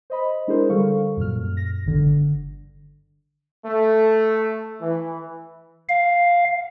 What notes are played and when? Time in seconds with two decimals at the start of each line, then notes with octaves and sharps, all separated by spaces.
0.10 C5 D#5 B5
0.47 G#3 D4 E4 G#4 A#4 C5
0.70 D3 G3 A4 F5 C#6
1.17 F#2 A#2 F6
1.57 A#6
1.86 G1 D3
3.66 A3
4.82 E3
5.89 F5